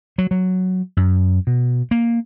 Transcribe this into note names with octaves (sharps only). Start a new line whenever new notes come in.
F#3
F#3
F#2
B2
A#3